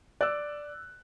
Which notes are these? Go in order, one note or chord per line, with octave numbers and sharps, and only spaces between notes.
D5 E6 F#6